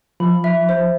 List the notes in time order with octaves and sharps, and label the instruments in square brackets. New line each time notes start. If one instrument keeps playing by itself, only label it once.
[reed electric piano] F3 [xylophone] B5
[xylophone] E5
C5